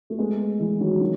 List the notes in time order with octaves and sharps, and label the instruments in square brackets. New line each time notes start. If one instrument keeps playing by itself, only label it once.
[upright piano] A3
G#3 B3
E3 G#3
D#3 F#3
D#3 F#3